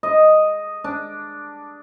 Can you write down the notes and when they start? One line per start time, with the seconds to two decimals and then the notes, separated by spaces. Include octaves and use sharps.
0.03 D#5
0.84 D4